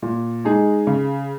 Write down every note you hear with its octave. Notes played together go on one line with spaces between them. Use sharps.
A#2
G#3 D#4 G#4
C#3